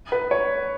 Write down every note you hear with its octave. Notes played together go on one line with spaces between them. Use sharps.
B4
C#5